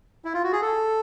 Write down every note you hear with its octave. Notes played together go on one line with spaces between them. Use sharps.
E4
F4
F#4
G#4
A4